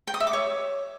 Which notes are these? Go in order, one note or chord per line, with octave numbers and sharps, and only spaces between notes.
G5
D#6
E5
D6
C#5